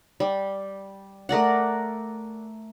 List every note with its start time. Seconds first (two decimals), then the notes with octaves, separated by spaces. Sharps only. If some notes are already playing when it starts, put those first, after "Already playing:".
0.20 G3
1.29 A3 A#4 D5 F#5